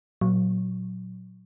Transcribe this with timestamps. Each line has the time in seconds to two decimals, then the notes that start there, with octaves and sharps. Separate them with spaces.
0.21 A#2 F#3